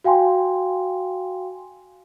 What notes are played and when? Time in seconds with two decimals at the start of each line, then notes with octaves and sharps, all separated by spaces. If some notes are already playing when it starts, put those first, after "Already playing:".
0.04 F#4 F5 G5 G#5 C6